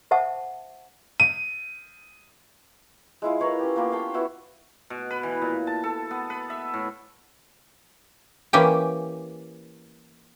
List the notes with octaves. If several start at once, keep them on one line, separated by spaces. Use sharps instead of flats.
C5 E5 F#5 A5
D#7
G#3 E4 F4
A#4 B4 C#5 F5
C#4 G4
A#3 B3 F4 G4
F5 G5 A5
B3 E4 F#4 C#5
B2
B4
E3
A#2
A5
A4
B3
B4
E5
A2
E3 A#3 C#4 G4 G5